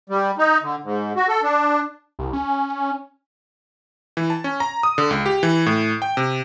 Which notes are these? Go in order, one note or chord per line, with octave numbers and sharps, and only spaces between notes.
G3
D#4
D3
G#2
F#4
A4
D4
C2
C#4
E3
A5
C#4
A#5
D#6
D3
C#2
G4
E3
A2
G5
C3